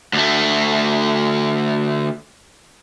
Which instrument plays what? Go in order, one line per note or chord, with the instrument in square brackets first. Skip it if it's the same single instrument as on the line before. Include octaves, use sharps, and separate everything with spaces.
[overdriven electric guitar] D2 A3